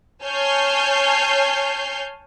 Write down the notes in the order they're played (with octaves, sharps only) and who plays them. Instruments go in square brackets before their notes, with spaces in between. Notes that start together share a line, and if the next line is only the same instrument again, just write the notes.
[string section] C#5 G#5 A5 F6 G6 C7